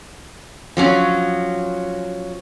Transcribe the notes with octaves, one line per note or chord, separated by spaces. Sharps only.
F3 F#3 C#4